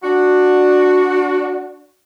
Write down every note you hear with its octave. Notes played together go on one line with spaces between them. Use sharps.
D4 F#4